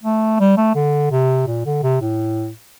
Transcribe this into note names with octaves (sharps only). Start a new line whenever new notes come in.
A3
G3
A3
D3
C3
A#2
D3
C3
A2